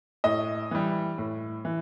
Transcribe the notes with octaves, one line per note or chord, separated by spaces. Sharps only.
A2 D#5
E3 G3
A2
E3